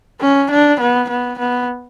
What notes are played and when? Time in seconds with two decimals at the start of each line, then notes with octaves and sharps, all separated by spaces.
0.21 C#4
0.51 D4
0.80 B3
1.10 B3
1.39 B3